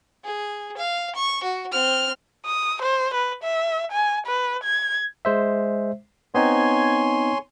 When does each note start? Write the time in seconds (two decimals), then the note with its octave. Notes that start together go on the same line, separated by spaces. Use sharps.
0.24 G#4
0.77 F5
1.15 C#6
1.43 F#4
1.72 C4 F6
2.45 D#6
2.82 C5
3.14 B4
3.44 E5
3.92 G#5
4.27 B4
4.63 G#6
5.25 G#3 C5 E5
6.35 B3 C4 D#4 C#5 G#5 C6